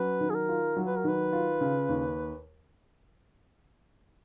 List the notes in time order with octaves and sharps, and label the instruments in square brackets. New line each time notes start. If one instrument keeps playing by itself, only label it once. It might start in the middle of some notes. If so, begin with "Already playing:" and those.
Already playing: [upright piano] F#3 C#4 [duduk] B4
[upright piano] D#3
[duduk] G#4
A#4
[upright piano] F4
F#3
[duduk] B4
A#4
[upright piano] D#3 [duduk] B4
[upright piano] F4
C#3
D#2